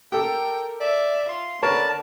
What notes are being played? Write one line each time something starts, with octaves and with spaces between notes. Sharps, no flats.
G4 A4 A#4 G5
D5 E5
F4 C6
D3 A#4 B4 C#5 A5